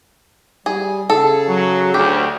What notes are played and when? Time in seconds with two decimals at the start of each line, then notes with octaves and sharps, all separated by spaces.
0.66 G3 G#4
1.10 C#3 G#4 A4
1.48 F#3
1.94 D2 G4